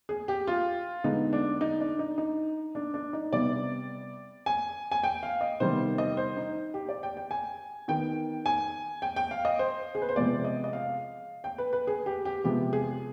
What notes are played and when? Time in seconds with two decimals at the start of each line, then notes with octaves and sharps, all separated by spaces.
0.09 G#4
0.28 G4
0.47 F4
1.04 D3 G#3 B3 D#4
1.33 D4
1.61 D#4
1.80 D4
1.99 D#4
2.18 D#4
2.75 D4
2.94 D4
3.13 D#4
3.32 C3 G3 B3 D5
4.46 G#5
4.91 G#5
5.04 G5
5.23 F5
5.41 D#5
5.60 C3 D#3 G3 B3 C5
5.98 D#5
6.17 C5
6.37 D#4
6.74 G4
6.89 D5
7.03 G5
7.17 G5
7.31 G#5
7.88 D#3 B3 G5
8.46 G#5
9.02 G5
9.16 G5
9.31 F5
9.45 D#5
9.59 C5
9.95 G#4
10.02 B4
10.09 C5
10.16 C3 F3 G#3 B3 D5
10.44 D#5
10.64 D#5
10.73 F5
11.44 G5
11.58 B4
11.73 B4
11.87 G#4
12.06 G4
12.25 G4
12.44 C3 F3 G#3 B3 G4
12.73 G#4